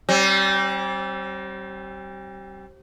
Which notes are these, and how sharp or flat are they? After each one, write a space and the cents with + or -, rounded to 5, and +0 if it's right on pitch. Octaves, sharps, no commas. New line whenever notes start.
G3 -30 C4 +35